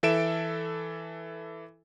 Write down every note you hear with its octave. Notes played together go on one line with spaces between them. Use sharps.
E3 A4 E5 D7 E7